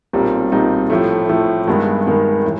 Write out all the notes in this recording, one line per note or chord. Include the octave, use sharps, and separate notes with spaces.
B1 A#2 G3 C4 D#4
B1 A#2 G3 C4 D#4
A2 F3 A3
A2 F3 A3
G2 D#3 G#3 B3
G2 D#3 G#3 B3
A2 E3